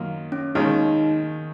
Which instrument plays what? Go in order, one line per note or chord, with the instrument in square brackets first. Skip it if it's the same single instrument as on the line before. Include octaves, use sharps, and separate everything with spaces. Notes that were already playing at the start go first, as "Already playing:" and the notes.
Already playing: [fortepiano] F#2 D#3 A#3 F4
[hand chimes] C#4
[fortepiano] D#2 D#3 G#3 C#4 [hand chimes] D#4